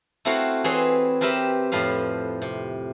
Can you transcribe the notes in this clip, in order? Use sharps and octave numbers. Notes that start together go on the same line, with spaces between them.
A3 C4 E4 F#4 F5 F#5
E3 C4 G#4 B4 C#5 C6
C4 G4 A#4 B4 E5 B5
F2 A2 F3 B4 F5
C3